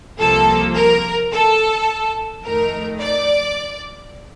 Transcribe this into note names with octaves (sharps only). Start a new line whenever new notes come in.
C2 C3 F3 A#3 F4 A4
A#4
A4
F2 D#3 A3 D#4 A#4
D5